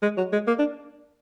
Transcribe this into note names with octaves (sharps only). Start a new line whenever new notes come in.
G#3
F#3
G#3
A#3
D4